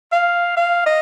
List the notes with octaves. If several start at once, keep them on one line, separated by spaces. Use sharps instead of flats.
F5
F5
D#5